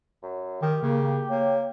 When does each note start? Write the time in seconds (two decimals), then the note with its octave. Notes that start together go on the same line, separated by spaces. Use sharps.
0.23 F#2
0.62 D#3 G4
0.82 C#3 A#3
1.30 A#3 C#5